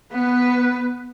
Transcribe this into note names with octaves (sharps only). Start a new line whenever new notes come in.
B3 B4